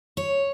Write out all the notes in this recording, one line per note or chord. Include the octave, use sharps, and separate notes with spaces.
C#5